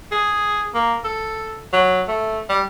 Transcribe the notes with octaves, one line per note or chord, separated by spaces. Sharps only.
G#4
A#3
A4
F#3
A3
G3